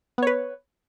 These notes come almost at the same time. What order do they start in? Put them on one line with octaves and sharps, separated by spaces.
B3 C#5 B4